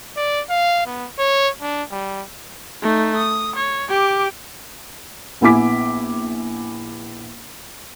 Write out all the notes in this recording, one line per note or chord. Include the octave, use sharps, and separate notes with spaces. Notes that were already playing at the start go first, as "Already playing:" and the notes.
D5
F5
B3
C#5
D4
G3
A3 D#4
D#6
C#5
G4 D6
A#1 B3 E4 G#5 D6 B6